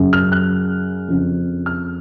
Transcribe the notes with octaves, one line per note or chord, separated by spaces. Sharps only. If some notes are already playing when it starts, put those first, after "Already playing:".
Already playing: F#2 C#3
F6
F#6
F2 C#3
F6